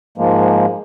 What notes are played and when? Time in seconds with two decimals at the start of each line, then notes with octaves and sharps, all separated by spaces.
0.18 G#2 F3 G#3 A#3